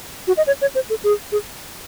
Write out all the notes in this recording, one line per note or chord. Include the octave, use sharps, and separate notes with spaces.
F#4
D#5
C#5
C#5
C5
A4
G#4
G#4